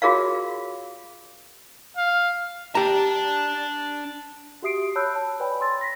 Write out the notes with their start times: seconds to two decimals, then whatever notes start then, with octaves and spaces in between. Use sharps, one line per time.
0.02 F4 F#4 G#4 A#4 C#5 F5
1.97 F5
2.75 D4 G4 A5 A#5
4.62 F#4 G4 E5 D#6 C7 D7
4.95 C#5 A5 B5 E6 F#6 G6
5.15 A5
5.40 B4 C#5 D5 G5 G#5 B5
5.61 C6 E6 A6
5.81 A#6 B6